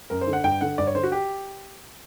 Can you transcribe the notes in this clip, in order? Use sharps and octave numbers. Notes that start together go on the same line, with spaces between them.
F#2 A#4
C5
D3
F#5
G2 G5
D3 F#5
G2 D5
C#5
D3 C5
F#4
G4